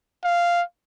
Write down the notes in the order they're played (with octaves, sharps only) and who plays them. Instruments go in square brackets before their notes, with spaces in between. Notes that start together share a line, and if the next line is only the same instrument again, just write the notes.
[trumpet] F5